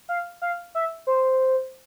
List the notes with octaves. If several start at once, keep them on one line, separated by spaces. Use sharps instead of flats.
F5
F5
E5
C5